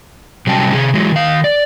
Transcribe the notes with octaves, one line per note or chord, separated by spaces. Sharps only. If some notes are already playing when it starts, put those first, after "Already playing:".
C3 F#3 G3 C#4 G5 A5
C3 G#4
E3 F#3 G#3
D#3 F5
D5